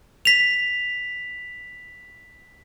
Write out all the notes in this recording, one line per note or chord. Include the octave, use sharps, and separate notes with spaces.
B6 F7